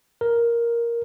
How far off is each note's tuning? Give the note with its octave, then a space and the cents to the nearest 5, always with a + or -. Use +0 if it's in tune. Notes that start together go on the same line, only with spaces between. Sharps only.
A#4 +5